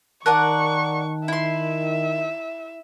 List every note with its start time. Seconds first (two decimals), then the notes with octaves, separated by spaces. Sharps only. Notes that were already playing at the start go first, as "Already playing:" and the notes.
0.26 D#3 A#4 D5 F#5 A5 C#6 F#6
1.28 E4 E5 C6